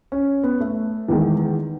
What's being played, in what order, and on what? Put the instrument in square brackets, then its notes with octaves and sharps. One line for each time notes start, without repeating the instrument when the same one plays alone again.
[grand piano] C#4
B3
A3
[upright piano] E2 D#3 G#3